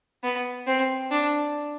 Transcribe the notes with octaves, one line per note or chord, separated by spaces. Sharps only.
B3
C4
D4